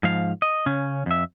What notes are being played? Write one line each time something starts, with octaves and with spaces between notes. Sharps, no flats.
G#2 F3 F5
D#5
C#3 C#4
F2 E5